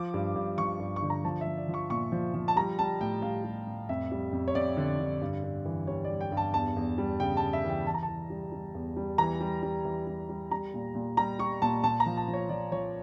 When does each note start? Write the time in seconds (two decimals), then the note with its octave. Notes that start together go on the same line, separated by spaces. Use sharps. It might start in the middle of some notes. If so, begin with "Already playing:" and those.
Already playing: F3 D6
0.14 G2
0.36 G2
0.58 F3 C#6
0.80 G2
0.96 C#6
1.02 D3
1.10 A#5
1.25 F3 A5
1.41 E5
1.46 F3
1.57 D5
1.68 F3
1.74 C#6
1.90 A#2 C#6
2.12 F3
2.34 F3
2.48 A5
2.56 G3 A#5
2.79 G3 A5
3.01 A2 G5
3.22 G3 F5
3.44 G3
3.67 A2
3.89 F2 E5
4.12 G3
4.33 F2
4.48 C#5
4.55 F2 D5
4.77 D3
5.00 D3
5.21 G2
5.44 G2
5.65 E3
5.87 G3 C#5
6.04 D5
6.10 G3
6.21 G5
6.32 G2
6.37 A5
6.54 E2 A5
6.77 E2
6.98 G3
7.20 C#3 G5
7.37 A5
7.42 C#3
7.53 E5
7.65 E3
7.70 G5
7.86 E3 A5
7.94 A#5
8.03 A5
8.08 E3
8.30 G3
8.52 G3
8.75 E2
8.97 G3
9.18 E3 A#5
9.41 G3
9.63 G3
9.85 E3
10.07 G3
10.29 G3
10.51 G3 A#5
10.74 A#2
10.95 A#2
11.17 G3 A#5
11.39 G3 C#6
11.62 A#2 A5
11.84 A#2 A5
12.00 A#5
12.06 F3
12.17 A5
12.28 F3
12.33 C#5
12.49 F3 D5
12.72 F3 C#5